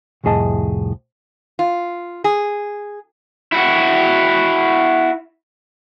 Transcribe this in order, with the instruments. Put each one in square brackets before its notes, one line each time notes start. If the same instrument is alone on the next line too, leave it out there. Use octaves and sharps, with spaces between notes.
[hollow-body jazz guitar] C2 F2 A2 G#4 D#5 A5
[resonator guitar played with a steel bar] F4
G#4
[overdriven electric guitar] E4 F#4